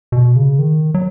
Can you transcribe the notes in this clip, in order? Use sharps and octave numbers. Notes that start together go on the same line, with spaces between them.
B2
C#3
D#3
F#3